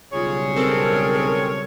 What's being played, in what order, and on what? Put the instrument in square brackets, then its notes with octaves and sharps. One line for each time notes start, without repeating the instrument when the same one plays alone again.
[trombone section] B1 C#3 G3 [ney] F4 [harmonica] G#4 C#5
[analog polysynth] C4 A4 [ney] A#4